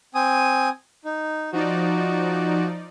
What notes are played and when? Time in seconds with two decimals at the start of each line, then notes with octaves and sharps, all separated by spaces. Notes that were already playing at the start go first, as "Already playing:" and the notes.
0.15 C4 G#5 D#6
1.05 D#4
1.53 F3 D#4 F#4 D5